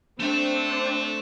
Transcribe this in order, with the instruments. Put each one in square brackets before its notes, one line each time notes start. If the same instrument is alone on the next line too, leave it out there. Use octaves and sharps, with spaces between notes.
[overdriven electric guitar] A3 E5 [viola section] C4 D4